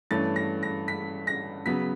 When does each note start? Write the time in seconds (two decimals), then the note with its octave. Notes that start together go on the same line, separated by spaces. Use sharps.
0.11 G2 E3 A3 C#4 A6
0.36 A#6
0.63 A#6
0.88 B6
1.27 A#6
1.66 C#3 F#3 B3 B6